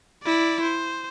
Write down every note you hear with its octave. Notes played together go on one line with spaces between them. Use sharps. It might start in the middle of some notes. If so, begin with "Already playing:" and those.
E4 D5
C5